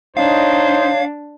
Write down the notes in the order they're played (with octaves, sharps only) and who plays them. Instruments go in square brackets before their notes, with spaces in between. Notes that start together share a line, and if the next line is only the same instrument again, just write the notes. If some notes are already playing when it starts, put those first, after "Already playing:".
[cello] D4 [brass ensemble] D#4 C5 [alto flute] C#5 [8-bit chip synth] F5